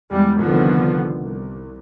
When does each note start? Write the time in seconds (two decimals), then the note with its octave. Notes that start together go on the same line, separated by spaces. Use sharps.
0.11 E2 G3 G#3
0.41 C2 D3 D#3 F3 B3
1.20 C2